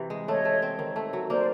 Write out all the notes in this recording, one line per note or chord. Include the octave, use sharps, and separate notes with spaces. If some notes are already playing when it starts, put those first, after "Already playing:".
Already playing: C3 E3
G#3
A3 C#5 D#5
A3
C4
D#3
A3
F#3
A#3 C5 D5